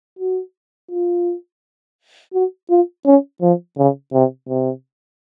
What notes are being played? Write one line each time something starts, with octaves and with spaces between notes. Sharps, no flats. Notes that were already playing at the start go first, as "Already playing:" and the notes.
F#4
F4
F#4
F4
C#4
F3
C#3
C3
C3